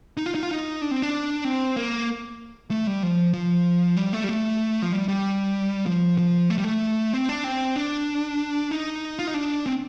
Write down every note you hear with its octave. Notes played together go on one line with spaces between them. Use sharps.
D#4
F4
D#4
F4
D#4
D4
C4
D4
C4
A#3
A3
G3
F3
F3
G3
A3
G3
A3
F3
G3
G3
F3
F3
A3
G3
A3
C4
D4
C4
D4
D#4
F4
D#4
D4
C4